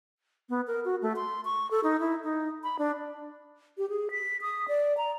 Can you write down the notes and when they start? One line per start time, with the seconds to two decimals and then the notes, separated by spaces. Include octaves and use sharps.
0.49 B3
0.67 A#4
0.85 F#4
1.02 A3
1.16 C6
1.45 C#6
1.71 A4
1.84 D#4
2.00 E4
2.24 D#4
2.63 B5
2.79 D4
3.78 G4
3.90 G#4
4.11 B6
4.42 D#6
4.68 D5
4.97 A#5